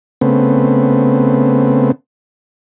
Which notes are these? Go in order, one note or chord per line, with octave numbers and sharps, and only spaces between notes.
C#3 A3 B3 C4